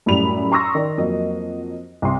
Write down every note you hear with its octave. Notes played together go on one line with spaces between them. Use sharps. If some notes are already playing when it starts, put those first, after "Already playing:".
F#2 A2 G3 B5 F7
A#5 C6 C#6 D#6 E6 A#6
D#3 D5
F2 F#3 A#3 D#5
C2 C6